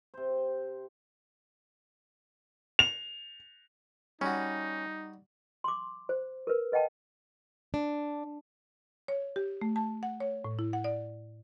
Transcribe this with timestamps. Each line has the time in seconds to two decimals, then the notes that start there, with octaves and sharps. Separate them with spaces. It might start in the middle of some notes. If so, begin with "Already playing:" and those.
0.14 C3 C5
2.79 F7
4.21 G3 C#4 D#4 F#4
5.64 C6 D6
6.09 C5
6.47 A#4 B4
6.72 B4 D#5 F#5 G5 A5
7.74 D4
9.08 C#5
9.36 G4
9.61 A3
9.76 A5
10.03 F#5
10.20 C#5
10.45 A2
10.59 E4
10.73 F#5
10.84 D5